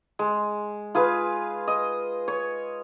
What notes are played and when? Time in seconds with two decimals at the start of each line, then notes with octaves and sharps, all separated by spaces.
0.19 G#3
0.95 F4 G#4 B4 F5
1.68 D#5
2.28 C#5